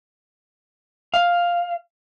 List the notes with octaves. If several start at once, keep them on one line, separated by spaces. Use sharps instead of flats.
F5